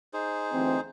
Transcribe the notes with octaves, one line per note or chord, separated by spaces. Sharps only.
D#4 G#4 C5
D2 E3 C4